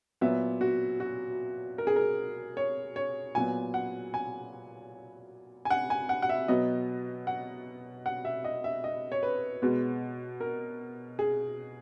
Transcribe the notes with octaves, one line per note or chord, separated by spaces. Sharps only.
A#2 F#3 B3 E5
F#4
F#4
A#4
G#4
A#4
C#5
C#5
A#2 F#3 B3 G#5
F#5
G#5
G#5
F#5
G#5
F#5
F#5
E5
B2 F#3 B3 D#5
F#5
F#5
E5
D#5
E5
D#5
C#5
B4
B2 G#3 B3
A#4
G#4